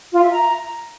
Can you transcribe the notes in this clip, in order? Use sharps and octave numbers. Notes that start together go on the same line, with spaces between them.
F4
E5
A#5